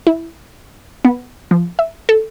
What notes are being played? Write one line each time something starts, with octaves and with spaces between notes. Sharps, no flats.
E4
B3
F3
E5
A4